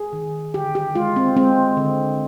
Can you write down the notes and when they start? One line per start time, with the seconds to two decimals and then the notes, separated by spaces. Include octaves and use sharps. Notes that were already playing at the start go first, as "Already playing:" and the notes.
Already playing: G#4
0.13 D#3
0.54 D3 G4
0.75 G4
0.95 G#3 F4
1.16 C4
1.36 G#3 C4
1.77 D3